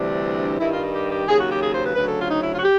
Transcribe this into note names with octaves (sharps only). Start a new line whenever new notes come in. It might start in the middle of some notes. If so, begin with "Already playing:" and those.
Already playing: D2 C3 E3 G3 D4
G2 D#3 G3 E4
F4
G4
G4
D#2 C#3 F#3 G#4
F#4
G4
G#4
C5
B4
D2 C#3 F#3 B4
A4
F4
D#4
E4
F4
F#4
G4